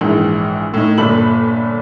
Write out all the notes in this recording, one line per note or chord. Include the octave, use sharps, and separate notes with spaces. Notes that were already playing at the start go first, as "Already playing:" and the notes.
A#1 G#2 E3
A2 D#4
G1 A#2 A4 B5 F#7